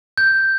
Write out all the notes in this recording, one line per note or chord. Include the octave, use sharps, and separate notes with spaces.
G6